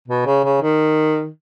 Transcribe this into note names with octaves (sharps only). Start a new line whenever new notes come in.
B2
C#3
C#3
D#3